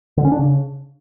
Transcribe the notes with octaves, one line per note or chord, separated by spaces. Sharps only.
D3
C#4
D4
C#3